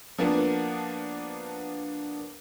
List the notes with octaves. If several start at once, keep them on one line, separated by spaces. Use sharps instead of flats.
F3 A#3 B3 D4